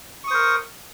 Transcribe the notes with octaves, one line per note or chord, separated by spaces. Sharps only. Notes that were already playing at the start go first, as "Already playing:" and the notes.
A#4 C5 C#6 D#6